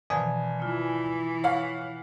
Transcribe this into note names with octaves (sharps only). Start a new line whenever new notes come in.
G#1 B2 E3 F3 D5 G#5 A5
E3 F4
C#5 F5 F#5 B6